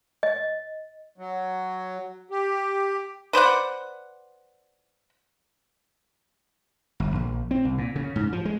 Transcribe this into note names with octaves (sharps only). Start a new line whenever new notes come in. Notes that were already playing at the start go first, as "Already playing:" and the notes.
D#5
F#3
G4
B4 C5 D5 F#5
G1
A#1
C4
C2
A#2
C#3
G#2
F3
G#3